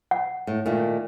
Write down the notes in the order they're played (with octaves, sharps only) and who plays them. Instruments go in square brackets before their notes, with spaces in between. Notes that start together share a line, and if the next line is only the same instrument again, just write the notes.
[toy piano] F#5
[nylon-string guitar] A2
A#2 D#3 A3